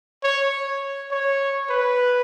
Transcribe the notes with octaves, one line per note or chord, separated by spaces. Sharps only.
C#5
C#5
B4